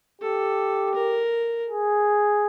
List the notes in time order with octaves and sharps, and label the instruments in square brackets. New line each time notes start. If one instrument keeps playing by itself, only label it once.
[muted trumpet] G4 [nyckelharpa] A4
[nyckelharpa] A#4
[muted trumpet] G#4